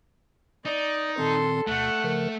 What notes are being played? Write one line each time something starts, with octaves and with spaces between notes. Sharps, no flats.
D#4 D5
A#2 D#3 C4 A4 C6
D2 B2 A3 F#5
C#3 F3 A#4